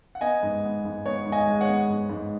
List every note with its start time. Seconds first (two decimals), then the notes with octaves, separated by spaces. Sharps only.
0.15 F#5
0.21 B3 D#5 G#5
0.43 G#2
0.64 B3
0.85 G#2
1.06 B3 C#5
1.25 G#2
1.32 D#5 G#5
1.47 G#3
1.61 C#5 F#5
1.68 B3
1.89 G#2
2.09 G#2